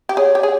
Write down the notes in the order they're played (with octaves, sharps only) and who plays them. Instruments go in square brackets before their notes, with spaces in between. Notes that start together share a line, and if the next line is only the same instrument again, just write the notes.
[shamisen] G4
[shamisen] G#4 [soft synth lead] C#5
[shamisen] G4
[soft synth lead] D5
[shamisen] G#4 [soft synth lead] C#5